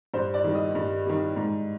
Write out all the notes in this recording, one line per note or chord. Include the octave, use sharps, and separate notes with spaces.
G2 C5
D5
D#3 G3
D#5
G2
D#3 G3
G#2